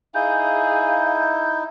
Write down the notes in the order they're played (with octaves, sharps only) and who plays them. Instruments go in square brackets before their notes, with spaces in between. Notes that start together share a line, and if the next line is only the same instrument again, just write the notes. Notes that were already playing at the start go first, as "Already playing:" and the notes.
[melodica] D#4 E4 [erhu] G#4 [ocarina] F5 [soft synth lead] G6